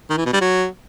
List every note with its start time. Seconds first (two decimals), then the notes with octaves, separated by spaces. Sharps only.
0.10 D#3
0.18 E3
0.26 B2
0.33 G3
0.41 F#3